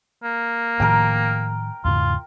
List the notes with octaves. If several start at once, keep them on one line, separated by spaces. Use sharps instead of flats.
A#3
A2 D#3 F3 A#4 G5
E2 G#2 C#3 F4